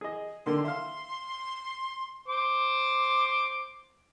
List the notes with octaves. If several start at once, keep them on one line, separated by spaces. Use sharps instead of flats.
G#4 D#5
D3 D#3 A#3 C6
E5 F5 C6
C5 D6